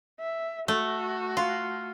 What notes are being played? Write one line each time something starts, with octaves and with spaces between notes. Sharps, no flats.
E5
A3 F#4
F4